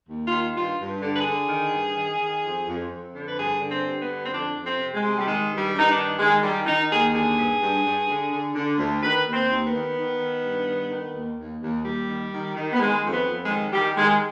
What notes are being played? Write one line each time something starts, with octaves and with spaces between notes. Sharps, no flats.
D#2
F4
D#3
G2 F4
G2
D3
B4
G#4
D3
D#3
G2
D#3
D#3
F2
F2
F2
D3
B4
G2 G#4
D3
C4
G2
B3
D3
C4
F2 D4
F2
C4
C3
G#3
C3
G3
D#3 G#3
G2
G3
G2
D#4
D4
D#3
D#3 G#3
D#3 G3
D#3 D#4
D#2 G#4
D3 G#4
G2
G2
G2
D3
D3
D3
D2
D#3 B4
D#2
C4
D#2
B3
D#3
D#3
D#3
G2
D#3
D#3
D#2
D#2
D#2
D#2 G3
D#3
D#3
D#3
B3
D#3 G#3
F2
B3
F2
G#3
D#3
D#3 G3
D#3 G#3